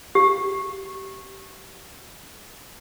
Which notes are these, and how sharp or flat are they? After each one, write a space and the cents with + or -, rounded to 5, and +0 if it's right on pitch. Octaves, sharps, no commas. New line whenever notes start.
G4 -20